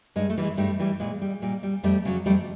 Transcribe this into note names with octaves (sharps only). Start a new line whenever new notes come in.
G2 G#3
A3
E3 G3
G#3
G2 G3 A3
E3 G3
A#2 G#3
G3
A#2 G3
G3
F2 G3 A3
C#3 F#3
F2 G3 A3